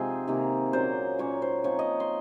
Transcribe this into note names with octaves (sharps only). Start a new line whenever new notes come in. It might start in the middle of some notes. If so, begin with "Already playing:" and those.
Already playing: C3 F3 G#3 C4 D#4 G#4
C3 D#3 A#3
A#2 F#3 C#4 C5
A#2 F#3 A#3 C#4 C#5
C5
F3 C4 D#4 C#5
D#5
C6